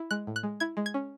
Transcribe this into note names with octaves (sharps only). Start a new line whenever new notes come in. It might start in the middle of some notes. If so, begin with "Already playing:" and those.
Already playing: E4
G#3 F#6
A2
F#6
G#3
E4 G#6
G#3
G#6
C#4